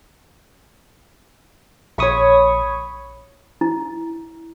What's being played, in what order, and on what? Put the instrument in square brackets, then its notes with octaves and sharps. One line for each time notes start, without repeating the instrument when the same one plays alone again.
[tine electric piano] A#1 C#6 D#6 [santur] C#5 B5
[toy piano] E4